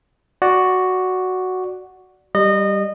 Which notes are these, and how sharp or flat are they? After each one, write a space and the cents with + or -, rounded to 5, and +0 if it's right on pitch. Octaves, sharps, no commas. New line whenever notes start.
F#4 +0 D5 +0 F#5 +0
G3 +0 D#5 -25